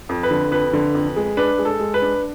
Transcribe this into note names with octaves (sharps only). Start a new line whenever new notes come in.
F2
B4
D3
F2 B4
D3
F2
G#3
D4 B4
G#3
A4
G#3
B4
D4